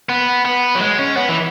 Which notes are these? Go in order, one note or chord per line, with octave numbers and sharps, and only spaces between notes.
B3
B3
F#3
G#3
C#4
B3
E3